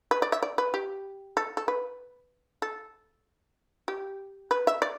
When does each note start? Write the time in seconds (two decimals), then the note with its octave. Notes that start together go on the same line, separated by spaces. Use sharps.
0.11 B4
0.22 D5
0.32 E5
0.42 D5
0.58 B4
0.74 G4
1.37 A4
1.57 A4
1.68 B4
2.62 A4
3.88 G4
4.51 B4
4.67 E5
4.82 D5